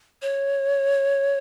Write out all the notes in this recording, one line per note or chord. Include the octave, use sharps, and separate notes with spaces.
C#5